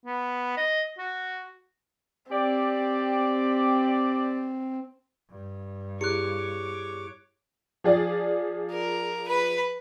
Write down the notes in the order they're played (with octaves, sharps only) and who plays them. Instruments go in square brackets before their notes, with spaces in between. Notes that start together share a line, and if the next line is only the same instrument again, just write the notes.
[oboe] B3
D#5
F#4
[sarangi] C4 [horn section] G4 D5
[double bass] G2
[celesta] E4 G4 G#4 [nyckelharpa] C#5 D6 [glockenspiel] F#6 C#7
[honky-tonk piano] F3 G#4 D5
[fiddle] A#4
B4 B5